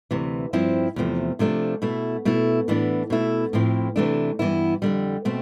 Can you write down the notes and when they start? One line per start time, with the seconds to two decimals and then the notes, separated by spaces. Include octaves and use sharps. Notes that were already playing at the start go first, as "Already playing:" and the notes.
0.11 D2 C3 E3
0.53 G2 F3 C4 E4
0.96 E2 C3 F3 A3
1.39 C3 F3 A3 D4
1.82 B2 A3 E4
2.25 B2 A3 E4
2.68 A2 E3 B3 D4
3.10 B2 A3 E4
3.53 A2 F3 C4 E4
3.96 C3 E3 A3 D4
4.39 G2 E3 B3 E4
4.82 F2 D3 G3
5.25 B2 A3 C4